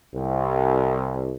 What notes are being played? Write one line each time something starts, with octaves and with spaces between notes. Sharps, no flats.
C2